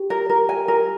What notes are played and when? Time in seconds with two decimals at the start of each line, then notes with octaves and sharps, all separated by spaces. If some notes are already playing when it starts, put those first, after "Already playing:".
Already playing: G4
0.10 A#4
0.30 A#4
0.49 G#5
0.68 A#4